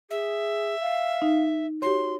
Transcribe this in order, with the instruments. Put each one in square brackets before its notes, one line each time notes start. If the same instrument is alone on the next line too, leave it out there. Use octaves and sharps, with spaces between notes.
[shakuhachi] G#4 [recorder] E5
[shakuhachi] F5
[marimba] D#4
[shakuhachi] F#4 [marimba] G4 C#5 [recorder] C6